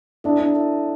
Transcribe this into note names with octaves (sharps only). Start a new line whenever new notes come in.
D4 E4 A4 E5 A5
D4
E4 A4 E5 A5